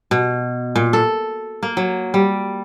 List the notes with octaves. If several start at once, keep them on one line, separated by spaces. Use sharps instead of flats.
B2
A#2
A4
A#3
F#3
G3